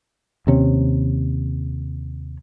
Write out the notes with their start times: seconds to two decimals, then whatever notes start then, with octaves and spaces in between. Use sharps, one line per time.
0.47 D#2 C3 C#4